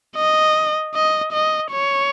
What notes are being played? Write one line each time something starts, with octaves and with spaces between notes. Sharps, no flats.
D#5
D#5
D#5
C#5